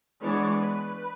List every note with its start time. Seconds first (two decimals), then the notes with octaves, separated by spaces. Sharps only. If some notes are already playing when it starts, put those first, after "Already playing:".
0.21 E3 G#3 B3 D4 C#5
0.57 B4